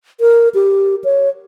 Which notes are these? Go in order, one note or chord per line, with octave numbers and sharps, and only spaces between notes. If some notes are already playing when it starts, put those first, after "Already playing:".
A#4
G4
C#5